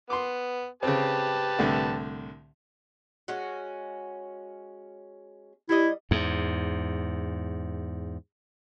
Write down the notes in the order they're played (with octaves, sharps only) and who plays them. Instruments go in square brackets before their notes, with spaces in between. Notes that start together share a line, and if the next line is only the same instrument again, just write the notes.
[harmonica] B3 [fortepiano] C6 D6
[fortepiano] C#3 C4 [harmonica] G4 B4 A5
[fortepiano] C2 A2 D3
[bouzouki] G#3 C#4 F#4
[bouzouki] G3 D#5 [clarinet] E4
[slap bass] E2 G#2